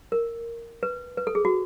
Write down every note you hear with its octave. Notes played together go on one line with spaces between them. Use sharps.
A#4
B4
B4
A4
G#4
F#4